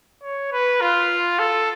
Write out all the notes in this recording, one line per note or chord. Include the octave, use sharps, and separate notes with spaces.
C#5
B4
F4
A4